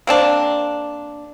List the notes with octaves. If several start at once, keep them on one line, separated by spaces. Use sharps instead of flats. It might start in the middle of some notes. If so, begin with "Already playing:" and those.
A#3 C4 D4